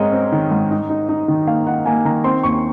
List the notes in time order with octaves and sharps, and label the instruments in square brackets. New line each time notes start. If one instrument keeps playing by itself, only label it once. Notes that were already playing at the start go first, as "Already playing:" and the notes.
Already playing: [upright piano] G#2 G#3 C4 A#4 C#5 D#5
C4
D#3
G#2
D#4
D#4
D#4
D#3
A#3 F5
D#4 F#5
A#3 G#5
D#3 A#5
C4 C6
D#2 C#6